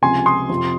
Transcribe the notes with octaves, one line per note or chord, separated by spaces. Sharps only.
C#2 C3 F3 G#5 C6
C6 D#6
F2 C3 F3